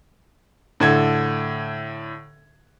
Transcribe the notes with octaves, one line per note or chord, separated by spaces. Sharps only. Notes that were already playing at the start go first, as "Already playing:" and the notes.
A2 D3 A4 G#6